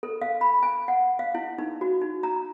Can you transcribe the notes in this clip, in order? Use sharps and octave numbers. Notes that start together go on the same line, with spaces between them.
A4
F5
B5
G#5
F#5
F5
E4
D#4
F#4
D#4
A#5